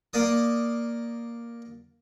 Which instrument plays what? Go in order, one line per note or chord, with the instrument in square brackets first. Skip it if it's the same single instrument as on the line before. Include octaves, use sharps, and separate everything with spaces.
[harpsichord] A#3 D5 D#6